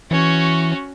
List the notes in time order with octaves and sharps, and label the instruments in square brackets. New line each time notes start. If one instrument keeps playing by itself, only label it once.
[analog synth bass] E3 [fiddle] C#4 F#4